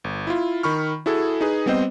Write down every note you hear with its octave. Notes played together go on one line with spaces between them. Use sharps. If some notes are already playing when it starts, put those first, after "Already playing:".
G1
E4 F4
D#3 B5 C#6 F6
E4 F#4 G#4 A4
D#4 G#4 B4
G3 B3 C4 C5 D#5